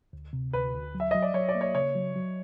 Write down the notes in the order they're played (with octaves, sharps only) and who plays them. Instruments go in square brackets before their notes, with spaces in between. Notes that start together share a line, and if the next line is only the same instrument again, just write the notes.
[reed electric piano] D2
C3
[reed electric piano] D2 [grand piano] B4
[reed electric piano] D2
F#3
[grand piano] E5
[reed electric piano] F#3 [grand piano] D#5
[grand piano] D5
[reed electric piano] F#3 [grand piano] C#5
[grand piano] D5
[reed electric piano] A#3
[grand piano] C#5
[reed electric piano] C#3 [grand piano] C#5
[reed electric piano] F#3
F#3